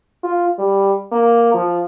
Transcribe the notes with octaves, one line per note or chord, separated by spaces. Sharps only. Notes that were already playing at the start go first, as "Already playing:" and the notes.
F4
G3
A#3
F3